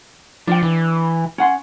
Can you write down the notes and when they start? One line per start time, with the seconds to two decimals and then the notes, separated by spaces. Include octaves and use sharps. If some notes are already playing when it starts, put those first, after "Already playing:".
0.47 F3 D4 G5
0.63 E3
1.38 C#4 F#5 C6